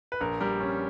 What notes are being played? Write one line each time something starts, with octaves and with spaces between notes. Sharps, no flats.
B4
A#1 A#4
G3 A#4
C#4